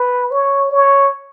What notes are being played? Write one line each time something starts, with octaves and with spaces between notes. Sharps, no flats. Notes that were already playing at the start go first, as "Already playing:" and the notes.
Already playing: B4
C#5
C#5